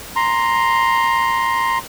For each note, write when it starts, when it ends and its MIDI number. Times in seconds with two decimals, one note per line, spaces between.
0.16 1.78 82
0.16 1.78 84